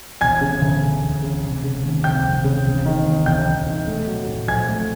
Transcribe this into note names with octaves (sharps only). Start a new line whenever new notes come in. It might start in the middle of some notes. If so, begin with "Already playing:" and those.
E1 G#5 G#6
C#3
D2
E1
E1
C#3
F1
C#3
D#2
F1 G5 G6
F1
C#3
E1
D#3
D#2
E1 G5 G6
E1
D#3
A3
F#3
A2
A#1 G#5 G#6
A3